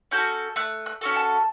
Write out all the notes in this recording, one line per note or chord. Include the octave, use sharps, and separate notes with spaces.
C#4 F#4 A4 G6
A3 F#6
F#6
C#4 F#4 A4
A5